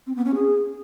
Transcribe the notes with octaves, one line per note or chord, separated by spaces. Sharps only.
C4
B3
C#4
G#4